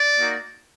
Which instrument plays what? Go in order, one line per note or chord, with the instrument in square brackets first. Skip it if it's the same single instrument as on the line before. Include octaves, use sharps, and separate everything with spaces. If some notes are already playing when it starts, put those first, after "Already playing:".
Already playing: [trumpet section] D5
A#3 D#4 F#4